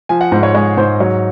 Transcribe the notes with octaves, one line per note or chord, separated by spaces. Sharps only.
F3 G#5
F#5
G#2 C5
C#5
G#3 C#5
G#2 C5
F#3 C#5